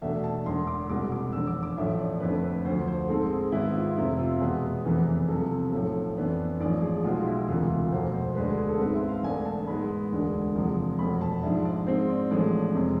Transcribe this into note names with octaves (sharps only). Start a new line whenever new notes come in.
E2 B2 A3 D4 E5
A5
E1 E2 D3 C6
D6
C2 B2 G#3 D6
D6
F1 E2 D3 E6
D6
D6
A1 A2 F3 E5
D5
F1 F2 D3 A3 B4
B4
D2 D3 F3 C5
C5
G#2 G#3 C4 A4
G#4
G#1 G#2 G#3 B3 E4
F4
F1 F2 C3 E4
F4
E2 B2 G#3 B3 G#4
F1 E2 C3 E3 B3
C2 C3 F3 A4
B1 A2 F3 A4
F2 E3 B3 D4
A1 G#2 F3 D5
G#4
B1 B2 G#3 F4
E4
E1 D2 C3 E3 F4
F4
F1 E2 B2 C5
C5
D2 D3 G#3 D4 B4
A4
G#4
A4
G#2 G#3 C4 B4
E5
F5
E1 E2 D3 A3 D4 G#5
A5
G#2 G#3 B3 B5
E1 D2 D3 G#3 D4
E2 C3 F3 G#3
F1 E2 B2 B5
A5
G#2 F3 G#3 D4 E5
D5
G#2 G#3 C4 C5
D5
A1 A2 F3 G#3 D4 D5
F2 C3 G#3